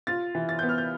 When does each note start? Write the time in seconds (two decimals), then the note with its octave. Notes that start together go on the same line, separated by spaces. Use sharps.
0.07 F4 A6
0.35 E3
0.49 A6
0.59 B3 G6
0.69 F6
0.78 G6